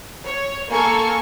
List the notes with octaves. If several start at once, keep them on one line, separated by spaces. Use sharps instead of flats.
C#5
A#3 A4 G#5 C#6